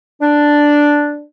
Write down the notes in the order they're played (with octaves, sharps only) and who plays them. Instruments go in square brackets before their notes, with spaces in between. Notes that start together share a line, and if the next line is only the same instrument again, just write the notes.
[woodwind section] D4